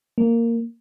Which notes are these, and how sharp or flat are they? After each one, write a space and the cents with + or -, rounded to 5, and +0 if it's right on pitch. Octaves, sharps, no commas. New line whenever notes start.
A#3 -10